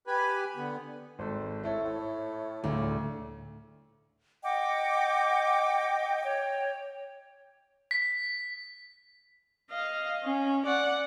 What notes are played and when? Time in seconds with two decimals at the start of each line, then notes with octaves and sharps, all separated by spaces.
0.07 G4 B4 G#5 B5
0.56 D3 B3
1.19 G#1 A4 C5
1.63 A3 E4 A4 C#5
1.85 A2
2.64 D2 A2 C#3
4.44 D#5 F#5 G5 D6
6.23 C#5 G5
7.91 B6
9.71 D#5 F5
10.24 C#4
10.66 D5 F#5